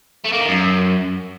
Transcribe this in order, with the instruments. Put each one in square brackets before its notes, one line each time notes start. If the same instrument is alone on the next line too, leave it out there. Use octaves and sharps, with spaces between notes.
[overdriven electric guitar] A3
A#3
D#3
F#2